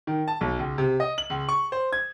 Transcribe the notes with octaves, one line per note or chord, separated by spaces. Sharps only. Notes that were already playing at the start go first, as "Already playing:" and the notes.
D#3
A5
B1
C#2
C3
D#5
F#7
C#2
C#6
C5
G#6